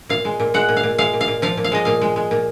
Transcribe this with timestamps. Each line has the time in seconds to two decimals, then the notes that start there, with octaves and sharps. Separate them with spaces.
0.09 A#2 F5
0.25 G#3
0.40 A#2
0.54 G#3 F#5
0.69 A#2
0.77 F5
0.83 A#2
0.98 G#3 F5
1.13 A#2
1.21 F5
1.28 A#2
1.42 F3 F5
1.57 A#2
1.64 F5
1.72 G#3 D#5
1.85 A#2 F5
2.02 G#3
2.16 G#3
2.31 A#2